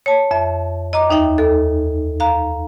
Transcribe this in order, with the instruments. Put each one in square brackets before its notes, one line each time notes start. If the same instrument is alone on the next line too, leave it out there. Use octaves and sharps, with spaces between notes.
[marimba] C#5 A5
F2 E5
D#5 A#5 D6
D#2 D#4 E5 G5
D#2 A4
F5 A#5